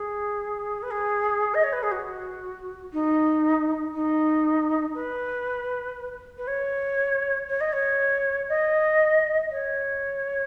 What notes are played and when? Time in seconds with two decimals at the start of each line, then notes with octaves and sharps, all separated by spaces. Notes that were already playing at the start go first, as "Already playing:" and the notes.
Already playing: G#4
0.82 B4
0.91 G#4
1.54 D#5
1.64 C#5
1.73 B4
1.83 G#4
1.91 F#4
2.93 D#4
3.94 D#4
4.95 B4
6.38 B4
6.47 C#5
7.48 C#5
7.60 D#5
7.73 C#5
8.49 D#5
9.51 C#5